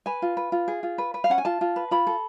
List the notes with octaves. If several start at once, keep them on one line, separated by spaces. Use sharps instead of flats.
B4 G#5
F4
B4
F4
G#4
F4
B4
B4
F5
C#4 F#5
G#5
F4 A5
F4
B4
F4 B5
A4